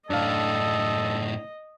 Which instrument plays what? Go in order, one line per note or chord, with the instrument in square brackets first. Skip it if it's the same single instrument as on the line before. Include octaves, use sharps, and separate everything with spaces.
[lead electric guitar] F#2 A2 [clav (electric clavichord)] D4 F5 [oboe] A4 [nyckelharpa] D#5